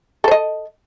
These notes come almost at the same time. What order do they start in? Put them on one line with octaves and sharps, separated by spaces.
A4 C5 D#5